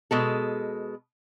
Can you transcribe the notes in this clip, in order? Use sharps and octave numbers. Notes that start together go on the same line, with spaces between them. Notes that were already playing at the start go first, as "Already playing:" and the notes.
B2 G#3 A4